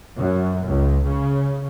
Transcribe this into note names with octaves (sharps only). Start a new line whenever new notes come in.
F#2
C#2
C#3